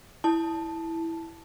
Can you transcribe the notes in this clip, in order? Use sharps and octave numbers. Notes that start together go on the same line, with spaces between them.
E4 A5